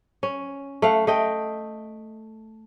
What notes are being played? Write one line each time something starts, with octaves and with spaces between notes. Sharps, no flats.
C#4
A3 F5 F#5
A3 D#5 G5